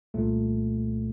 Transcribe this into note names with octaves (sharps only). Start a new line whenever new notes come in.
C2 A#2 A3